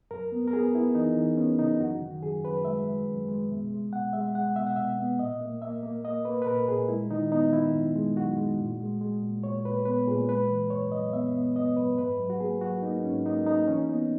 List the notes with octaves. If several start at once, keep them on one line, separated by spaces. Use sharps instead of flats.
F#2 A#4
B3
A#4
B3 G#4
B3 E4
E3 D#4
E3
B3 C#4
C#3 D#4
F#2 F#4
D#3
F#2 G#4
F#2 B4
G#3 E5
G#3
F#2
G#3
B2
G#3
B2 F#5
G#3 E5
G#3 F#5
B2 E5
F#5
B2 E5
B3
A#2 D#5
A#3
A#3 E5
A#3
A#3 D#5
A#3 B4
B4
A#2 A#4
A#2 G#4
G#3 E4
D#3 D#4
B3 D#4
D#3 E4
F#2
G#3
F#2 F#4
G#3
A#2
G#3
G#3
A#2
A#2 C#5
A#2 B4
B3 B4
A#2 G#4
G#3 B4
E3
F#2 C#5
F#2 D#5
B3 E5
B3
B3 D#5
F#2 B4
G#2 B4
F#3
F#4
A#3 G#4
F#3 F#4
A#3 D#4
G#2 C#4
A#3 D#4
A#3 D#4
E3 C#4
B3 D#4